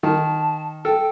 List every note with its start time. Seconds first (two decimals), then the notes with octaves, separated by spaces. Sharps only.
0.03 D#3 A5
0.85 A4 G5